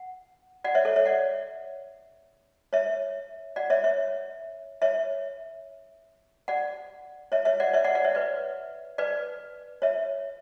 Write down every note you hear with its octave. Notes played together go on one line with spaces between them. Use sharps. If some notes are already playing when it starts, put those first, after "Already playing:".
Already playing: F#5
D5 F#5
C#5 E5
A4 C#5
C#5 E5
D5 F#5
C#5 E5
D5 F#5
C#5 E5
C#5 E5
C#5 E5
D5 F#5
C#5 E5
C#5 E5
D5 F#5
C#5 E5
D5 F#5
D5 F#5
C#5 E5
B4 D5
B4 D5
C#5 E5